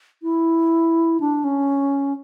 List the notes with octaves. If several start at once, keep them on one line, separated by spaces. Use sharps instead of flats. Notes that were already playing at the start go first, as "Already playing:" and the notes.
E4
D4
C#4